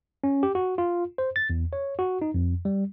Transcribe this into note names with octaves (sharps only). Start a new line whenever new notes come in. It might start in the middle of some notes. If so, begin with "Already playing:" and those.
C#4
G4
F#4
F4
C5
A6
E2
C#5
F#4
D#4
F2
G3